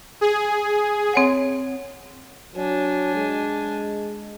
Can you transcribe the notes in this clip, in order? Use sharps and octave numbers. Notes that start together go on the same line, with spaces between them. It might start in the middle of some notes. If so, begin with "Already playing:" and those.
G#4
C4 C#5 F#5
F#3 D4 G#5
G#3